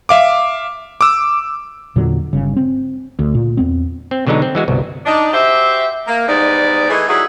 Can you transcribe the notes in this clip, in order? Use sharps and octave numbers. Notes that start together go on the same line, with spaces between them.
E5 F5 D6
D6 E6
E2 A#2 D3 F#3
G1 C#3
C4
D2
A#2
E2 B3 C4
C4
B2 D3 F#3 G#3 D#4
C4
E3 G#3 F#4
G1 C2 B2
D4 D#4
F#4 G4 C5 E5
A#3
E2 G#2 G3 B3 D#4 D5
D#3 E3 A3 D#4 G#4
D#3 F#3 G3 E4 F#4 G#4